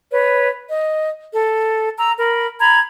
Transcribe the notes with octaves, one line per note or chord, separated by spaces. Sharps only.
B4 C#5
D#5
A4
A#5 E6
A#4 B5
A#5 B5 G#6